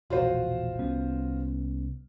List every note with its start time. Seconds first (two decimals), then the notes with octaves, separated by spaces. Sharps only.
0.10 E1 A#1 F4 F#4 C5
0.79 C2 B3 C#4